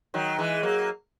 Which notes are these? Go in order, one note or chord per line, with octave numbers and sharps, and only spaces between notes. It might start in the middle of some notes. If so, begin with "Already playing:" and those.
D#3 F#3
E3 G#3
F#3 A#3